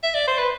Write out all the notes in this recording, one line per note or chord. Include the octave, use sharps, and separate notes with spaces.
E5
D5
C5
B4